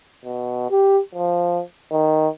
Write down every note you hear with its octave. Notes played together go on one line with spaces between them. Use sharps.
B2
G4
F3
D#3